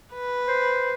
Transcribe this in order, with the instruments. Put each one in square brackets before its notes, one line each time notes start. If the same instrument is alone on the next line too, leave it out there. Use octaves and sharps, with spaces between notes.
[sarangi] B4
[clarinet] C5